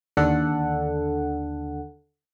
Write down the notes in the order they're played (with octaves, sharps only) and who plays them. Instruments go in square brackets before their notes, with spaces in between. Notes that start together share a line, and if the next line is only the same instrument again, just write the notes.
[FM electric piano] D#2 D3 D4 A4 F#5